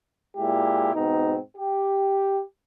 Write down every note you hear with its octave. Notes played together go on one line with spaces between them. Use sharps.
A#2 G#3 E4 G4
G#2 B2 C4 D#4
G4